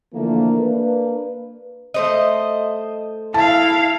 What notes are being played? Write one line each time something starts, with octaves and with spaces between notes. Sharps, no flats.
D3 E3 F3 A3 A#3
A#3 D4 A#4 B4
A3 C5 D#5
E4 F5 A5